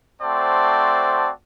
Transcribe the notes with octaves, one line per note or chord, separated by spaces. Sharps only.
A3 C4 F#4 C5 D5 A5